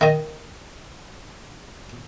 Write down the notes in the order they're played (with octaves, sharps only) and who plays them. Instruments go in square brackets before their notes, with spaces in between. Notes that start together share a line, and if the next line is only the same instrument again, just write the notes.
[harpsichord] D#3 D#5